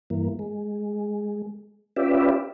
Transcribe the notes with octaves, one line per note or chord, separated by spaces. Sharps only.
G2 E3 A#3
G#3
C#4 F4 G4 B4 D5 E5